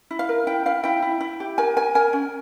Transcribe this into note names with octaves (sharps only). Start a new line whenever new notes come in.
E4
F5
A#4
E4 G5
E4 F5
E4 G5
E4
E4
G4
A#4 G#5
A#4 G#5
A#4 G#5
C#4